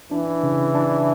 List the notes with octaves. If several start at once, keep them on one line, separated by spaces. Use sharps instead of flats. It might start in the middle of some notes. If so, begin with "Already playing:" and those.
E3 D4
C#3
D4